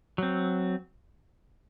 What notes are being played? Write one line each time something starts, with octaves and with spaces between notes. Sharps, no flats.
F#3 C4